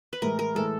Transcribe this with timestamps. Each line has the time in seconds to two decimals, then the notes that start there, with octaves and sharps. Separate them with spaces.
0.13 B4
0.22 A2 E3 G#3 A#4
0.39 A#4
0.55 A2 E3 G#3 A4